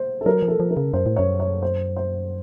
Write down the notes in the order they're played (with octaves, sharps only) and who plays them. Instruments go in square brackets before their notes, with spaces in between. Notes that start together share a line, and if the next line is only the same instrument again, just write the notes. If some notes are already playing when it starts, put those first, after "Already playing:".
Already playing: [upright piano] C5
A4
[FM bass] F#3 [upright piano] A#4
[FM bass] F3
[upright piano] A4
[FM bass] F3
[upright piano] A#4
[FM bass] C#3
[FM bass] F#2 [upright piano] C5
[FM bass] A2
[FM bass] F#2 [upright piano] C#5
[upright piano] C#5
C5
C5